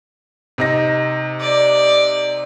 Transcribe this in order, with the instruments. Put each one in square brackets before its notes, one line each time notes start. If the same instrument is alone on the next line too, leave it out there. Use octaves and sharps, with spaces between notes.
[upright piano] C3 D#4 A#6
[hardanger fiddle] D5